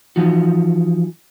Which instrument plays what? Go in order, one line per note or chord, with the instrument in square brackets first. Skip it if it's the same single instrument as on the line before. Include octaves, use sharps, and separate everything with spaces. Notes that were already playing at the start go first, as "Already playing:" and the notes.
[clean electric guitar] E3 F3 D#4 F#4